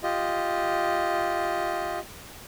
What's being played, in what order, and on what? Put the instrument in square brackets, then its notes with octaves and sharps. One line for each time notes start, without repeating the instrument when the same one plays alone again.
[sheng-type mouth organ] F4 G4 D#5